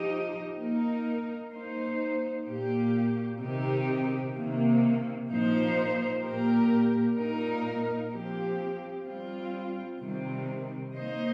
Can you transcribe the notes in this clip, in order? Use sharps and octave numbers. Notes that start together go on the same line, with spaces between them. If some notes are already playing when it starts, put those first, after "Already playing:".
Already playing: F3 D#4 G4 D#5
A#3 D#4 A#4
A#3 D#4 C5
A#2 A#3 G4
C3 D#3 C4 D#4 G4
C3 D#3 A#3
A#2 F3 A#3 D#4 C5
A#2 A#3 G4 A#4
A#2 A#3 D#4 A#4
F3 C4 G4
G3 C4 F4
C3 D#3 G3 C4
A#3 D#4 C5 D#5